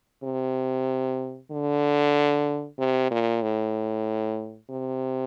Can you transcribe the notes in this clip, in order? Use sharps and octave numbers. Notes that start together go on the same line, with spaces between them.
C3
D3
C3
A#2
A2
C3